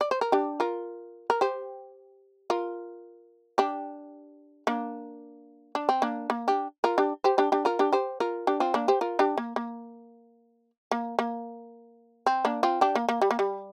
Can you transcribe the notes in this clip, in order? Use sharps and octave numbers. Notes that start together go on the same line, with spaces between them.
D5
C5
A#4
D4 G4
F4 A#4
A#4
G4 C5
F4 A#4
D4 G4
A#3 D4
D4
C4
A#3 D4
A#3
D4 G4
F4 A#4
D4 G4
G4 C5
D4 G4
D4 G4
F4 A#4
D4 G4
G4 C5
F4 A#4
D4 G4
C4 F4
A#3 D4
G4 C5
F4 A#4
D4 G4
A#3
A#3
A#3
A#3
C4
A#3 D4
C4 F4
D4 G4
A#3
A#3
G3
A#3
G3